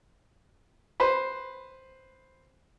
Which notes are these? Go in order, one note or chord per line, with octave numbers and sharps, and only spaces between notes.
B4 C5